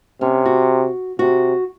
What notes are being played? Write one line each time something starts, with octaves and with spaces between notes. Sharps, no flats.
C3 C#4
F#4
C3 F#4